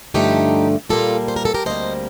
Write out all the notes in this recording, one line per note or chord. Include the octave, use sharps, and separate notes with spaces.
G2 D3 F3 A3 D#4 G4
A#2 G3 A#3 F4 A4
C5
A#4
A4
G4 A#4
D2 C3 G3 A#3 C5 D#5